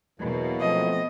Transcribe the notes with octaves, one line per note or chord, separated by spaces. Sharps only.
E2 B2 E3 F#3 A#3
F3 A3 C4 D#5